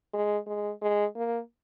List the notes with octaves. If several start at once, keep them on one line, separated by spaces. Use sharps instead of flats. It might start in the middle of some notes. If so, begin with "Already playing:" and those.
G#3
G#3
G#3
A#3